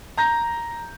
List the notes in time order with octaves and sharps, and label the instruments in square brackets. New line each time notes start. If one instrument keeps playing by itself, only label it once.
[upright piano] A#5 G6 A#6